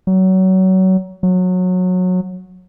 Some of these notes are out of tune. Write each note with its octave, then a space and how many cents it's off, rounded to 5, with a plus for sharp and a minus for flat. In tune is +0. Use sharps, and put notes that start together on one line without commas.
F#3 +25
F#3 -20